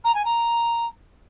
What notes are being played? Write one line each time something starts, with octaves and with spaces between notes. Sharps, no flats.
A#5
G#5
A#5